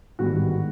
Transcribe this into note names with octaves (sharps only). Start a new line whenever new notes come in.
A1 G#2 D#3 G3 B3 F#4